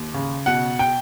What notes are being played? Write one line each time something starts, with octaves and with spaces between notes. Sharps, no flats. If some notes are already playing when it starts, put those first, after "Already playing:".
Already playing: D#2
C#3
B2 F#5
G5